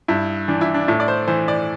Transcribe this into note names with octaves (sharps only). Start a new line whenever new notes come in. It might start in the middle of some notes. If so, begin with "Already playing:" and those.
G2 E4
E3 D4
E4
D4
A2 E4
D5
C5
E3 C5
D5